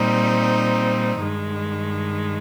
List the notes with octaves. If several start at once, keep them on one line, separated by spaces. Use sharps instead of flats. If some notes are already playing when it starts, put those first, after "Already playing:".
Already playing: A#2 G3 C4 D#4
G2 D#3 G#3